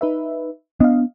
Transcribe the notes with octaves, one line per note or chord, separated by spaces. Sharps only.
D#4 B4 E5
B3 D4 D#5 F5